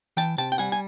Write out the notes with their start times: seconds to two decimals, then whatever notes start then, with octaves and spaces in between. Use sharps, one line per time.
0.17 E3 G5 A5
0.38 C3 G5 A5
0.52 G5
0.58 G3 F#5 G#5
0.72 G#5